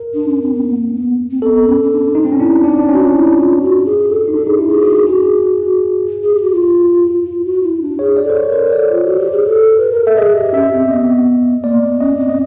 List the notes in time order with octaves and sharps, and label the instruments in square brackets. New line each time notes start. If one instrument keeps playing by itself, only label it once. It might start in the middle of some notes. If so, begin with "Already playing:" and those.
Already playing: [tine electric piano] A#4
[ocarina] D4
C#4
C4
B3
A#3
B3
C4
[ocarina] B3 [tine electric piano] A4
[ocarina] C#4
C#4
D4
[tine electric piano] D#4
C4
C#4
[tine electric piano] D4 [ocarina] E4
[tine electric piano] D4 [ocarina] D#4
[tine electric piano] D4
[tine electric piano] C#4 [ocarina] F#4
[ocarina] F4
E4
F4
F#4
G#4
G#4
A4
[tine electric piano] D#4
[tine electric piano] D4 [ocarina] A4
[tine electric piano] D#4 [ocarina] G#4
[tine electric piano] E4 [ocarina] G4
[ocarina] G#4
[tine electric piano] F#4
[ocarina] F#4 [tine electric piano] G#4
[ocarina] G#4
G4
F#4
F4
F4
F#4
E4
D4
[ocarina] G#4 [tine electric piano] C#5
[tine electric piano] D5
[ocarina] A4
[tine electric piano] C5
C#5
[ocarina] A#4 [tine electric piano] C5
[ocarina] A4 [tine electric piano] D5
[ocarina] F4
F#4
G4
G#4
A4
B4
A#4
[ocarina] A4 [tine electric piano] E5
[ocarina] G#4 [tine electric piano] D#5
[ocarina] G4
[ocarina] C#4 [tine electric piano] E5
[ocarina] C4
[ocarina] B3 [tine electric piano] D#5
[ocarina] A#3 [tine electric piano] D5
[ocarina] B3
[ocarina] C#4 [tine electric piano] D#5
[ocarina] C4
[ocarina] C4 [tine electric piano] D#5